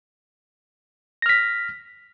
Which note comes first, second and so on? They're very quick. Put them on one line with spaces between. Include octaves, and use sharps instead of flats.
A#6 F6 B6